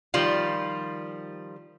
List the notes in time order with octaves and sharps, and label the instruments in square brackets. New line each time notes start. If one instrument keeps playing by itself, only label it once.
[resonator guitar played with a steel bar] D#3 F3 G3 F4